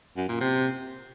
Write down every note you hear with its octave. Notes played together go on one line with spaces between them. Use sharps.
F#2
A#2
C3